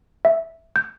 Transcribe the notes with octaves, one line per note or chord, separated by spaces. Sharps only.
E5
G6